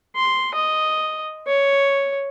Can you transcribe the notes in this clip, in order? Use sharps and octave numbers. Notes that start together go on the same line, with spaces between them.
C6
D#5
C#5